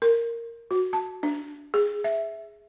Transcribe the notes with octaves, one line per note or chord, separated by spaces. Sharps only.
A#4
F#4
A5
D4
G#4
E5